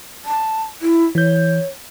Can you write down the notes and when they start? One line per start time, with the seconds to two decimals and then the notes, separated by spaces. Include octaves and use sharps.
0.25 A5
0.82 E4
1.15 E3 C#5 G6